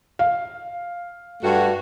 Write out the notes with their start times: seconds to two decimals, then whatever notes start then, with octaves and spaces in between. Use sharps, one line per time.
0.19 F5
1.43 G2 A3 F#4